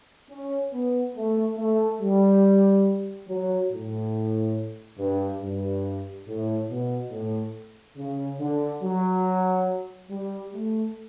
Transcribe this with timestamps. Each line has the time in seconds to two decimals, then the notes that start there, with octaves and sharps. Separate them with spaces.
0.30 C#4
0.72 B3
1.15 A3
1.57 A3
2.01 G3
3.29 F#3
3.71 A2
4.99 G2
5.42 G2
6.27 A2
6.68 B2
7.11 A2
7.96 C#3
8.39 D3
8.83 F#3
10.10 G3
10.53 A3